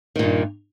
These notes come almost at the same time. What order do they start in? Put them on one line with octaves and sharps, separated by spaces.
D#3 A#2 G2